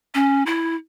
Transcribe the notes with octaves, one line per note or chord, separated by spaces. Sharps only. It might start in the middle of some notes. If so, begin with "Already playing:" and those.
C#4
E4